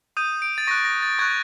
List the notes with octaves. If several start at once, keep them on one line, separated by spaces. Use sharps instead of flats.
D#6 G6 D#7
D7
A6
C#6 F#6 A#6
A#6
A6
C#6 F#6 G#6